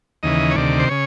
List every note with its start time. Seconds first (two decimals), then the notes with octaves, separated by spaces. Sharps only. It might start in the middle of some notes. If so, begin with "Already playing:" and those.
0.23 D#2 C#3 E3 D#5
0.51 C#5
0.56 D2 C3 D#3 D5
0.79 C5
0.89 C#3 C#5